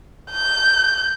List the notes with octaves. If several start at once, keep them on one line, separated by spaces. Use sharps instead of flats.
G6